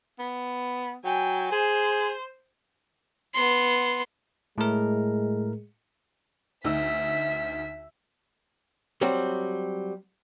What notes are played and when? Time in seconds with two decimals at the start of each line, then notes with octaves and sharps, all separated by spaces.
0.19 B3
1.05 F#3 G5 G#5
1.52 G#4 C5
3.34 B3 C6
4.58 A2 G#3 A3 A#4
6.64 D2 D#4 E5 E6 B6
9.01 F#3 G3 C4 F#4